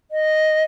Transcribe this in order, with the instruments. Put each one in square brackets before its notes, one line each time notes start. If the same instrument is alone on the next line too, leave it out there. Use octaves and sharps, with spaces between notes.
[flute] D#5